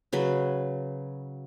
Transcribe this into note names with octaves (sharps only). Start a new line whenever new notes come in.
C#3 F#3 B4